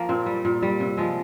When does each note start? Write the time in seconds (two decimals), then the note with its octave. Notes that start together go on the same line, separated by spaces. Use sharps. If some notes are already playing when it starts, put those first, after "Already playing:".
Already playing: F3 A#3
0.09 A#2 C4
0.26 G3
0.45 A#2
0.63 G3
0.80 C3
0.97 F3 G#3